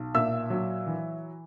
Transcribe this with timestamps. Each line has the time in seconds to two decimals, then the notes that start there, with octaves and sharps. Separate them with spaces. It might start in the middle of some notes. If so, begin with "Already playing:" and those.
Already playing: B1
0.15 A#2 E5 E6
0.50 F#3
0.86 E3